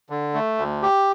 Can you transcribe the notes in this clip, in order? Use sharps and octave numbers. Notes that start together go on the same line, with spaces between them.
D3
A3
D2
G4